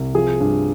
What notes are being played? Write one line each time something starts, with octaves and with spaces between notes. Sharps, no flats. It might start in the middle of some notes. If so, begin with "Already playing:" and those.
Already playing: C2
F3 G#4
G2